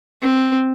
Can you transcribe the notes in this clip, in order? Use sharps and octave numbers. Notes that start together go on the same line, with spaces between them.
C4